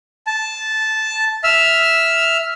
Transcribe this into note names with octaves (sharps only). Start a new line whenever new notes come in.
A5
E5 E6 F6